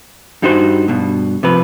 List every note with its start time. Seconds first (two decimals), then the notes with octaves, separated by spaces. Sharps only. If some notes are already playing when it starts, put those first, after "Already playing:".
0.42 G2 G3 D#4 F#4 C5
0.88 G2 B2
1.43 C3 F3 B4